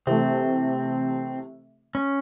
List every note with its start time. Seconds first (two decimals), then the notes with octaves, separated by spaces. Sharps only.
0.07 C3 E3 A3 C4
1.95 C#4